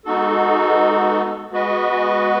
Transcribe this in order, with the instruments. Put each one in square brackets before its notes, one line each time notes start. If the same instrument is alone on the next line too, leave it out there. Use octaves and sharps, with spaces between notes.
[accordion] G#3 B3 D#4 F#4 A4
G#3 B3 F#4 B4 D#5